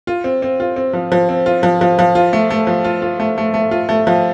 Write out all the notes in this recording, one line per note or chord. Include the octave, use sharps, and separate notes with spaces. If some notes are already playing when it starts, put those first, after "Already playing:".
F4
C4
C4
F4
C4
F3
F3
C4
F4
F3
F3
F3
F4
A3
A3
F3
F4
F4
A3
A3
A3
F4
A3
F3